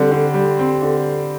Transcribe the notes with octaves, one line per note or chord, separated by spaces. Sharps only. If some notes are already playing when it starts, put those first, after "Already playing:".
Already playing: D3 G3 C4
D3
G3
C4
D3